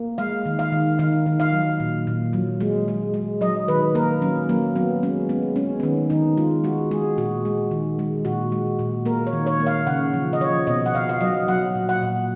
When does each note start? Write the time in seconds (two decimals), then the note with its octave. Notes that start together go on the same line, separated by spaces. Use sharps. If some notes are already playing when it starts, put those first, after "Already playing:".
Already playing: A#3
0.18 G#3 F5
0.46 D#3
0.59 F5
0.72 D#3
0.99 D#3 F5
1.26 D#3
1.40 F5
1.53 F#3
1.80 A#2
2.07 A#2
2.33 F#3
2.61 G#3
2.88 G#3
3.14 G#3
3.41 F#3 D#5
3.68 D#3 B4
3.95 A#3 A#4
4.22 F#3 C#4
4.49 F#3 A#3
4.76 F#3 B3
5.03 G#3 C#4
5.29 G#3 B3
5.56 G#3 C#4
5.80 B3
5.83 D#3 C#4
6.10 D#3 D#4
6.37 G#3 F4
6.64 G#3 F#4
6.91 G#3 G#4
7.18 A#2 F#4
7.45 G#3
7.71 D#3
7.99 G#3
8.25 A#2 F#4
8.52 G#3
8.79 A#2
9.06 A#3 A#4
9.27 C#5
9.33 D#3
9.47 C#5
9.60 A#3
9.67 F5
9.87 C#3 F#5
10.14 F3
10.33 D#5
10.41 F3 C#5
10.67 B2 D#5
10.86 F#5
10.94 B2 F5
11.09 F5
11.21 F#3 D#5
11.48 F#3 F#5
11.75 A#2
11.89 F#5
12.02 A#2